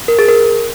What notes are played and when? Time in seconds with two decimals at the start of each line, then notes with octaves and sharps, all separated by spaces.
0.08 A#4
0.19 G#4
0.28 A#4